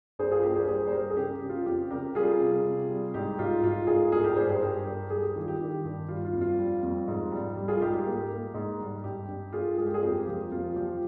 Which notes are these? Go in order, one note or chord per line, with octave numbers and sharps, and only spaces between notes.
G2 G#4 C5
F4 G#4
A#3 G4 A#4
G#4 C5
G3 G#4 C5
C5
G2 G4 A#4
G#4
C#3 G4
C#3
F4
F2 G4
C#3 G4 A#4
G3 F4 G#4
C3
C3
G3
G#2 G4
G#2 F4
G#2 F4
G#2 F4 G#4
G2 F4 G#4
G4 A#4
G2 G#4 C5
G#4 C5
G2 G4 A#4
G3
G3 G#4
G4
D#3 F4
G4
D#3
G2
G3 F4
F4
F2
F4
G3
F2
G#2
G3
G3
F4 G#4
G#2 G4
G4
A#3
A#3
G#2
G3
G2 G4
G2
G2 F4 G#4
G#3 G#4
G4
F4 G#4
F2 G4 A#4
F3 G4
F2 F4
F3 G4